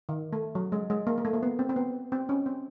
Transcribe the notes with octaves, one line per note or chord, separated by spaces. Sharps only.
D#3
A3
F#3
G#3
G#3
A#3
A#3
A3
A#3
B3
C4
C4
B3
C4
C#4
C4